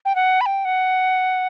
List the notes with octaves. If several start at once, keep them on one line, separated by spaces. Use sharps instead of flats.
G5
F#5
B5
G5
F#5